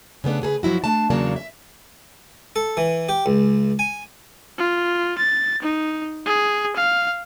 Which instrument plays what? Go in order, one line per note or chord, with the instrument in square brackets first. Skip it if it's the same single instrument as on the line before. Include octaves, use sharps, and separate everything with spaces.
[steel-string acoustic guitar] C#3 A3 B3 D4
C#3 G#4 A4 B4
F#2 F3 F#3 E4 F#4
A3 D4 A5
E2 C#3 F#3 A#3 D4 A5
E5
[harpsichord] A4
E3
G4
C#2
G#5
[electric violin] F4
A6
D#4
G#4
F5